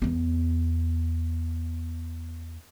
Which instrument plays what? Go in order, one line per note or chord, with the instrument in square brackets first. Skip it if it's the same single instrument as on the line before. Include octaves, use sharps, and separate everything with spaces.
[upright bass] E2 B3